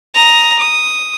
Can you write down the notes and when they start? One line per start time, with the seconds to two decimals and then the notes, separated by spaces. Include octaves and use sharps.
0.15 A#5 D#6
0.59 D#6